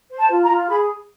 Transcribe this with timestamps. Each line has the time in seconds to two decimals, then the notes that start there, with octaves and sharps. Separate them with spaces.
0.11 C5
0.18 A5
0.30 F4
0.43 A#5
0.49 F4
0.68 G#4 B5